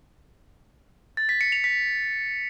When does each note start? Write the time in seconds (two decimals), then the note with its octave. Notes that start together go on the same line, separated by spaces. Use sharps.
1.17 A6
1.29 B6
1.41 C#7
1.52 F7
1.64 B6